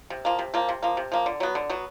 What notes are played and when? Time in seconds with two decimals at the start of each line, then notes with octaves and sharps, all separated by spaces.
0.10 C3
0.25 F3 A#3
0.39 C3
0.54 F3 A#3
0.69 C3
0.83 F3 A#3
0.97 C3
1.12 F3 A#3
1.26 D3
1.40 F#3 B3
1.55 D3
1.70 F#3 B3